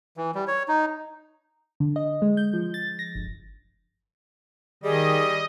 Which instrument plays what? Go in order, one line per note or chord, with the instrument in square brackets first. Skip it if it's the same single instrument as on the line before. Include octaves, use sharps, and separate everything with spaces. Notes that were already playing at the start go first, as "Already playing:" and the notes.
[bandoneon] E3
G3
C#5
D#4
[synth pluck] D3
D#5
G#3
G6
F3
A6
A#6
G1
[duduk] D#3 [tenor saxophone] G3 [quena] G#4 [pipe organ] D#5